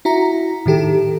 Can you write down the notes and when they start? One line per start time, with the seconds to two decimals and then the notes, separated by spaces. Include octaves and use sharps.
0.05 E4 F#4 A#5
0.66 A2 D#3 G4 A4